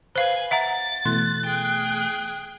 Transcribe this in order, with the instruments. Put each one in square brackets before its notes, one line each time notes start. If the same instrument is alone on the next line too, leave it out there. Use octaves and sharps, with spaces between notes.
[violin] B4 G#5 [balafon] C5 F5
[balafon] E5 F#5 A#5 [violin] A6
[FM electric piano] B2 E3 A3 [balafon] C6 [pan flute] F#6
[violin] G#4 G5